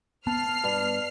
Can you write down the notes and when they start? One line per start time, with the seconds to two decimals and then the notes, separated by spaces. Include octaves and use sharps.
0.27 B3 A5 F6 C7
0.64 G2